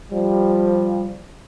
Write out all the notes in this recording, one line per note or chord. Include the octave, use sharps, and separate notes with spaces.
F3 G3